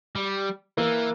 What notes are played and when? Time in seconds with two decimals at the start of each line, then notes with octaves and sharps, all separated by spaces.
0.16 G3
0.77 E3 A#3